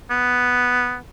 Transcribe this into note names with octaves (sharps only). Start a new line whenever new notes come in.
B3